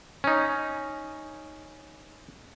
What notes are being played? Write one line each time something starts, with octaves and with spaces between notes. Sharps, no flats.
C#4 D#4